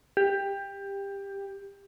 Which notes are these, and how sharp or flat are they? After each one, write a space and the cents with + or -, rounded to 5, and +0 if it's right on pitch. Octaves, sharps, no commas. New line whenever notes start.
G4 +15